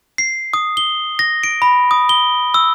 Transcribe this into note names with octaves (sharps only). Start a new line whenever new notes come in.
C7
D#6
G7
A#6
D7
B5
D#6
G7
E6